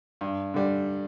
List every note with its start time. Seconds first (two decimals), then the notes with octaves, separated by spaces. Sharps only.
0.21 G2
0.54 D3 G3